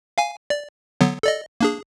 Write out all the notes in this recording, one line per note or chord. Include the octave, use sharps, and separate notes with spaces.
F5 G#5
D5
D3 F#3 B3
A4 D5 D#5
A#3 D4 G#4